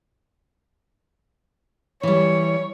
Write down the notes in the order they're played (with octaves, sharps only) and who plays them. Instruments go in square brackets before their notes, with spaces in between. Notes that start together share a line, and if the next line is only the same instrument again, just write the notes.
[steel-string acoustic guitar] E3 G3 [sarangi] C#5